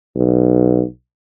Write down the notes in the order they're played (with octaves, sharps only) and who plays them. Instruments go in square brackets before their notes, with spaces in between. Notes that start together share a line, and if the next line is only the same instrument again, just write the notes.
[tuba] B1